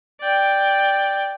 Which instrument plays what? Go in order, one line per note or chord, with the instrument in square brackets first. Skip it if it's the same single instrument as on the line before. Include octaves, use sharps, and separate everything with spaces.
[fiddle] D5 G5